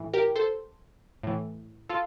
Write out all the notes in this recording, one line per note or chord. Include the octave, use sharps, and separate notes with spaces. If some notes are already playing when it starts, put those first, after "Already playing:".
Already playing: A2 E3
G4 A#4
A4 C5
A2 E3
F4 A4